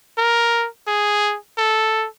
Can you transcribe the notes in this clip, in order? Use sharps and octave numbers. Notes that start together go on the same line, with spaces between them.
A#4
G#4
A4